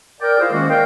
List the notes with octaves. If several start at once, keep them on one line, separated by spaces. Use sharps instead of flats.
A#4 D5 G5
E4 F4 G#4 C5 D#5 F5
D#3 G#3 A#3 C#4 F#4
A#4 D5 F5 G5